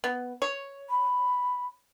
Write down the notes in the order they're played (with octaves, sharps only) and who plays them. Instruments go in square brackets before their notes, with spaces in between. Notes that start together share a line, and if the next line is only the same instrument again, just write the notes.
[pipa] B3
C#5
[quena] B5